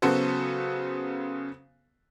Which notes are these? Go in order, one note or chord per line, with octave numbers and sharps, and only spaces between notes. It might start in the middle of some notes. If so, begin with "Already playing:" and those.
C#3 F#3 B3 F#4 A4 C5